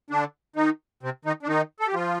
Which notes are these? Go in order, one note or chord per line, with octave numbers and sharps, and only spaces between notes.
D3 D4
D#3 D#4
C3 C4
D#3 D#4
D4
D#3 D#4
A4
G4
F3 F4